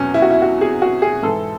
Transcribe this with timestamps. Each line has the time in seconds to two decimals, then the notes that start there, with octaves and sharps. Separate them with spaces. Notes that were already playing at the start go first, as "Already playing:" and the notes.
Already playing: E2 B2 F#3 C#4
0.14 E4
0.22 F#4
0.31 E4
0.42 F#4
0.61 G#4
0.82 F#4
1.02 G#4
1.22 G#2 E3 A4